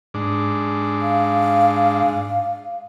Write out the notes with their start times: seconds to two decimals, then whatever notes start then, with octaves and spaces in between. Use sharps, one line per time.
0.14 G#2 D4
1.01 F5